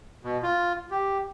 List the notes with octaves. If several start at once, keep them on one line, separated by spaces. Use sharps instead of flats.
B2
F4
G4